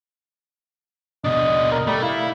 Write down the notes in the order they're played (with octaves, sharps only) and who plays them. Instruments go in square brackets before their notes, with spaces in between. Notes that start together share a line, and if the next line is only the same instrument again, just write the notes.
[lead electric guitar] B2 D4 [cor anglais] D#5
[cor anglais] A#4
[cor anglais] G3 [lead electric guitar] A3
[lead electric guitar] E4 [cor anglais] F5